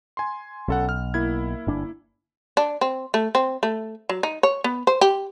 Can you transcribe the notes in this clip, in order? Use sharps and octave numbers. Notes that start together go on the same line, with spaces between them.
G#5 C6
B1 C#4 A4 F#5
F6
A#3 E4 G#6
G1 D4
D4
C4
A3
C4
A3
F#3
D#4
C#5
B3
C5
G4